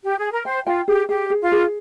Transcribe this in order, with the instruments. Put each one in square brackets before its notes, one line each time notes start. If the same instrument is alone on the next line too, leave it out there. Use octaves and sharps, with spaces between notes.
[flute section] G4
G#4
A#4
[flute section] C5 [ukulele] G5
[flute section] F4 [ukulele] G5
[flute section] G4 [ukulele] G#4
[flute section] G4 [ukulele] G#4
[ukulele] G#4
[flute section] F4
[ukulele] G#4